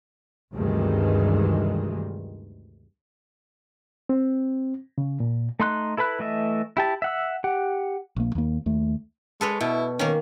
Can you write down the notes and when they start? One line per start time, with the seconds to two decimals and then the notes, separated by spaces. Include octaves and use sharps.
0.53 D2 G2 C3 D#3 E3 G#3
4.09 C4
4.98 C#3
5.20 A#2
5.60 A3 D#4 C6 F#6
5.97 E4 A4 B4 B5 F#6
6.19 E3 A3 D#5 E5
6.77 E4 G4 A5
7.02 E5 F#5 E6
7.44 G4 F#5
8.16 A#1 A#3
8.35 D#2 A#3
8.66 D#2 A3
9.41 G#3 A4 B4 C#5
9.61 B2 E4
9.99 D#3 A#3 C#4